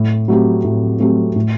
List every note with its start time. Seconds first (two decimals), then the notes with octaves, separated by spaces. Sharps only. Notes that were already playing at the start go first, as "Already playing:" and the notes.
Already playing: A2
0.28 F#3 A3 C4 G4
0.64 A2
1.00 F#3 A3 C4 G4
1.36 A2